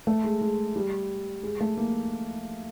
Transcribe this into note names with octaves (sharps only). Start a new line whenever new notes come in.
A3
G#3
G#3
G3
G#3
A3
A#3